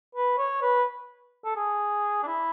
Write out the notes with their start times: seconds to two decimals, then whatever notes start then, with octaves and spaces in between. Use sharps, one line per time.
0.15 B4
0.38 C#5
0.62 B4
1.44 A4
1.56 G#4
2.23 D4
2.27 E4